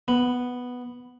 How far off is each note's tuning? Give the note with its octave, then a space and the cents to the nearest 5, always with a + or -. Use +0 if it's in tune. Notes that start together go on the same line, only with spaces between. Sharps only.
B3 +0